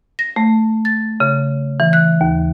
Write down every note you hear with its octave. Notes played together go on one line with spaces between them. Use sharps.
A#6
A3
A6
C#3
E3
F#6
D#2